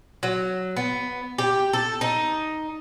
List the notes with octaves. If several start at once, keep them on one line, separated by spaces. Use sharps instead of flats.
F#3
B3
G4
A4
D#4